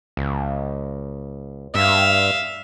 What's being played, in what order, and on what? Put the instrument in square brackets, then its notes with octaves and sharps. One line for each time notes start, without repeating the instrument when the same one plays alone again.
[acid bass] C#2
[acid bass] G2 [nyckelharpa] E5 F5